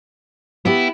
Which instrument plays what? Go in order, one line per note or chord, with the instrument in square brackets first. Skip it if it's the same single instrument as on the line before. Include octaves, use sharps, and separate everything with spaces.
[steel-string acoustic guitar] B3 G4 [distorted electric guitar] E4